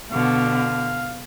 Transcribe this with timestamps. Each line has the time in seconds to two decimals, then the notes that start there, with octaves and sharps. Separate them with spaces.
0.11 B2 D3 F5